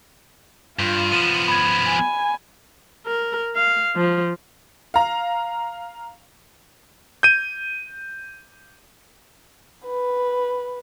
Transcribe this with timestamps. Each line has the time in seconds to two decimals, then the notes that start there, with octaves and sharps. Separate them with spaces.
0.79 G2 F4
1.12 F3 B3 D#7 E7
1.48 B5 G#6
1.88 G#5
3.06 A#4
3.56 F5
3.96 F3
4.94 F5 A#5
7.23 G6 D#7
9.86 B4